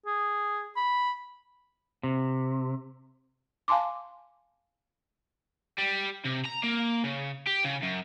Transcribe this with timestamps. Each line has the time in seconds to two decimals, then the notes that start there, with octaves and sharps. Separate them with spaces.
0.06 G#4
0.77 B5
2.03 C3
3.68 F5 G#5 A5 C6 D6
5.78 G3
6.25 C3
6.45 A#5
6.63 A#3
7.04 C#3
7.47 G4
7.65 C#3
7.83 F#2